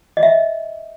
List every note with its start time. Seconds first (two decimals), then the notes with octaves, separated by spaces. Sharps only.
0.17 D#5
0.23 E5